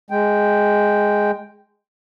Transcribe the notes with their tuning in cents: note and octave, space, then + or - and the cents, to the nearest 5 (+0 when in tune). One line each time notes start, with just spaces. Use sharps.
G#3 +0 G5 +0